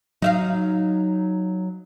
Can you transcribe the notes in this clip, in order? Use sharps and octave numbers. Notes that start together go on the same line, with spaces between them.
F#3 D#4 E5 F5